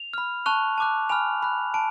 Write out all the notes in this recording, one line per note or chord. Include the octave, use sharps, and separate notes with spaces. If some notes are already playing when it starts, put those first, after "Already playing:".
Already playing: F7
B5 F6
A5 C#6 F#6 F7
A5 D6 F#6
G#5 B5 F6 F7
B5 F#6
A5 D7